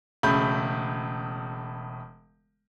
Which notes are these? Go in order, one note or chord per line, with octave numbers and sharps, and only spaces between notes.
E1 C#3 A3 B5 G6